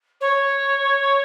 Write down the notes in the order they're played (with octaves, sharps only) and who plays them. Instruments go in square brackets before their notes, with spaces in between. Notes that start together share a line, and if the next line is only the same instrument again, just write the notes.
[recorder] C#5